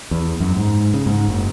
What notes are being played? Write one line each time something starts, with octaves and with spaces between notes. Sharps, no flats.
E2
F#2
G#2
C#3
G#2
F#1